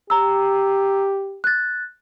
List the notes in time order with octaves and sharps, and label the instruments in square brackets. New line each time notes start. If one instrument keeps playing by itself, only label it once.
[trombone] G4 [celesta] A#5 E6
[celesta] F#6 A6